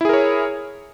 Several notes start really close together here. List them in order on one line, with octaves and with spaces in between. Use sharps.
E4 G#4 A#4 C#5